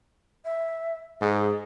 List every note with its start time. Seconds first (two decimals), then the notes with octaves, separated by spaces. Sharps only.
0.45 E5
1.21 G#2 G#4